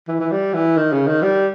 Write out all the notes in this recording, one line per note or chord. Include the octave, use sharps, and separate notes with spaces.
E3
E3
G3
E3
D#3
C#3
D#3
G3